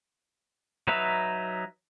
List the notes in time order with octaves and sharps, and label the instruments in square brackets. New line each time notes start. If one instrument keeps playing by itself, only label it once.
[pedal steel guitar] F#3 D#4 B4 E5 A#5